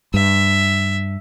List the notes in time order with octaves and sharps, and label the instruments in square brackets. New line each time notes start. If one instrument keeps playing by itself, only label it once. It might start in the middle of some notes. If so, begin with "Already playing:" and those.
[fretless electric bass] G2 [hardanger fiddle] E5